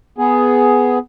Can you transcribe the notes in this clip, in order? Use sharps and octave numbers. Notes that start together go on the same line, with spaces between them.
B3 G#4